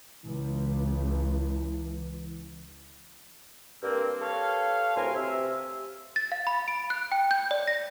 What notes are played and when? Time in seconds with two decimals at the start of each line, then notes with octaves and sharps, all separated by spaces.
0.24 C#2 E3
3.83 G2 A#3 C4
4.21 G4 A4 B4 C#5 F5
4.96 D2 A2 C3 A#4 G#5 C6
5.15 C3 E5
6.16 A6
6.32 F5
6.47 B5
6.68 D7
6.90 F#6
7.12 G5
7.31 G6
7.51 D5
7.68 A#6